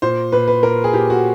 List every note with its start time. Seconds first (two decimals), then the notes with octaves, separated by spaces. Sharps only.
0.02 A#2 C5
0.32 A#2 B4
0.48 B4
0.63 A#2 A#4
0.84 G#4
0.93 A#2 G4
1.10 F#4